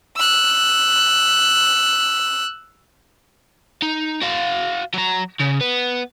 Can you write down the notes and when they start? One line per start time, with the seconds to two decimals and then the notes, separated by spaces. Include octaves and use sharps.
0.16 E6 F#6
3.82 D#4
4.22 F#4 F5
4.94 F#3 A#5
5.40 C#3
5.61 B3